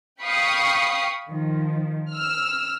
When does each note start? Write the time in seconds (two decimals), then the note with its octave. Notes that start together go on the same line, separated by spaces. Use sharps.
0.21 F5 G5 B5 C#6 D#6 C7
1.27 D#3 F3
2.11 E6 F6